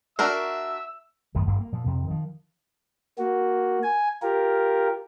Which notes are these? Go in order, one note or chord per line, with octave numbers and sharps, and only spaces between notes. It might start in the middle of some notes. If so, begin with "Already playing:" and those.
D4 F#4 A#4 E5 E6
F#2 A2 D#3 F3
F1 G2 A#3
A#3
A#2 F3
F2 C3 C4
D#3 F3
A#3 F#4
G#5
F4 G4 A#4